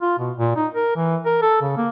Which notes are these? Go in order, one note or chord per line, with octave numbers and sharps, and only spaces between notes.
F4
B2
A#2
D#4
A#4
E3
A#4
A4
C#3
A#3